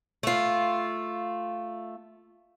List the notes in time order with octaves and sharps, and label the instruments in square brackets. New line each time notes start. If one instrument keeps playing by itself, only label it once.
[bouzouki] A3 F4